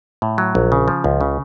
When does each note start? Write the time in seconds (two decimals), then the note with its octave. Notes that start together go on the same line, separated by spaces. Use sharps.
0.22 A2
0.38 F#3
0.55 A#1
0.72 C#3
0.88 F3
1.04 C#2
1.21 C#3